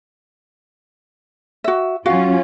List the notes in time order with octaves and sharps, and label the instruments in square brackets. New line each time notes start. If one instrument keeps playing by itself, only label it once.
[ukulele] F#4 E5
[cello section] F#3 C#4 F4 [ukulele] F#4 F5